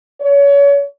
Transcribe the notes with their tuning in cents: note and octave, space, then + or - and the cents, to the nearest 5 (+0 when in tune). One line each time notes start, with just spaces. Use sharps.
C#5 +30